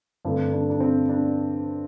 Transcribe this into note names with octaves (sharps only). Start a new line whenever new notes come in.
G2 D3 A3 C4
D4
D4
C4
D4